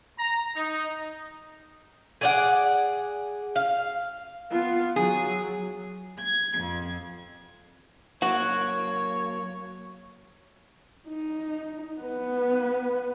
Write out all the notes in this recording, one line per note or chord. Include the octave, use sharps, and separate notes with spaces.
A#5
D#4
G#4 D5 F#5
F5
B3 F4
F#3 G#4
G#6
F2
F#3 A#3 F#4 C#5
D#4
B3 B4